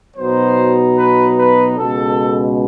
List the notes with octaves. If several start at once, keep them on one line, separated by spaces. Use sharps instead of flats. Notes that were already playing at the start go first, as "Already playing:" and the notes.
B2 F#3 B3 D#4 C5
B4
B4
C#2 B2 G#3 A4